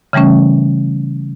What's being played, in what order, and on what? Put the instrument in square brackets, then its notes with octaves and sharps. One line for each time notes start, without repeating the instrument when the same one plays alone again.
[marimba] C#3 E3 G3 A3 C#4